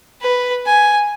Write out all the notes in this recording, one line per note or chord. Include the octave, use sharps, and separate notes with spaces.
B4
G#5